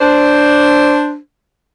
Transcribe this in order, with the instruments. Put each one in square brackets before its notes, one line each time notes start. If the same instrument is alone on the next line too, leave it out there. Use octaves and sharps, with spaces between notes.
[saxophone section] D4 C5